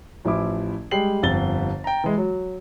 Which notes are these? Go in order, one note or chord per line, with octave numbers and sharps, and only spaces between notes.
A1 F3 E4 D6
G3 G#3 G5 C7 F#7
G1 F2 A6 G7
G5 A#5
E3 G#3
F#3